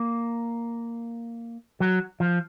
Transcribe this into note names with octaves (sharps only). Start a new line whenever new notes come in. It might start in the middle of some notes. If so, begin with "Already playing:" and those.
Already playing: A#3
F#3
F3